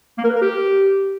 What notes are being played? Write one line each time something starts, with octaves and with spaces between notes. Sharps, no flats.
A#3
A#4
B4
A#4
G4